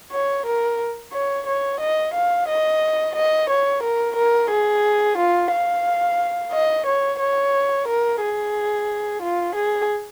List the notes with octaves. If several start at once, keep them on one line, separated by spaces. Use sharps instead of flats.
C#5
A#4
C#5
C#5
D#5
F5
D#5
D#5
C#5
A#4
A#4
G#4
F4
F5
D#5
C#5
C#5
A#4
G#4
F4
G#4